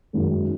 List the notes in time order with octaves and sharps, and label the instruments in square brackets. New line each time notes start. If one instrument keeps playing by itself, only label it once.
[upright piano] F#2 D#3 G#3